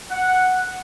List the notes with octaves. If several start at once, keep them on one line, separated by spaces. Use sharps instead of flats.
F#5